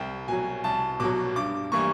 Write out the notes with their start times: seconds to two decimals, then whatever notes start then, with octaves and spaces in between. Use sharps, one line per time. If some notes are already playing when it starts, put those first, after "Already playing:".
Already playing: C2 G5
0.28 B2 F#3 G#5
0.64 C2 A5
1.00 B2 F#3 D6
1.36 G2 D6
1.72 E3 G3 A#3 C#6